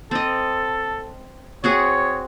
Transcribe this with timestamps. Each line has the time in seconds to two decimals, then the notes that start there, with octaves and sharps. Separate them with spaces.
0.11 C4 A4 D#5
1.64 C4 F#4 G#4 C#5